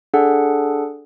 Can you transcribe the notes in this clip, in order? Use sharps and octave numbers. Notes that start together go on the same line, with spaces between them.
D4 G#4 A4 F#5